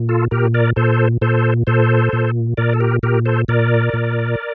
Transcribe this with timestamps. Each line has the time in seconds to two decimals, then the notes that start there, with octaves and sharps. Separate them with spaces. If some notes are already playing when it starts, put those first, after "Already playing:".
Already playing: A#2
0.09 F4 A4
0.31 A#2 G4 A#4
0.54 A#4 D5
0.76 A#2 A4 C5
1.21 A#2 A4 C5
1.67 A#2 A4 C5
2.13 A#2
2.57 A#2 A#4 D5
2.74 A4
2.80 G4 A#4
3.03 A#2 G4 A#4
3.26 A4 C5
3.48 A#2 A#4 D5
3.93 A#2